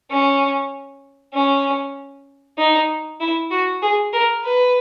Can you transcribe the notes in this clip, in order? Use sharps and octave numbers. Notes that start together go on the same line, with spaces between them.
C#4
C#4
D#4
E4
F#4
G#4
A#4
B4